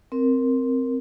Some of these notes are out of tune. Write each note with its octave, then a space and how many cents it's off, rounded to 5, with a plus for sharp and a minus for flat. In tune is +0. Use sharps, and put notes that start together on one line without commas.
C4 +0 A#4 +0